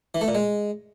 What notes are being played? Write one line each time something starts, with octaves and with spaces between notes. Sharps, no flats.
E3
A3
A#2
G#3